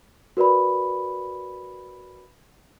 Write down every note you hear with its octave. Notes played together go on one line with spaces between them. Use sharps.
F#4 A#4 B4 D5 B5